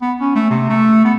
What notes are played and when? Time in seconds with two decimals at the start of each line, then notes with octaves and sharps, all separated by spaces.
0.02 B3
0.21 C#4
0.35 A3
0.50 C3
0.69 A3
1.04 B3